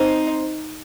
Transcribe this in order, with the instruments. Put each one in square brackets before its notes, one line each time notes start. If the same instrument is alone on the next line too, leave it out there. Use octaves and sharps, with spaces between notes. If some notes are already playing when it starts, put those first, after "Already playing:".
Already playing: [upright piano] C4 C5 [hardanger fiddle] D#4